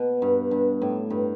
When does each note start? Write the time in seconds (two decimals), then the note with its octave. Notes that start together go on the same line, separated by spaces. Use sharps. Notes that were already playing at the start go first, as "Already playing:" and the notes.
Already playing: B2
0.22 G2
0.51 G2
0.82 A2
1.10 G2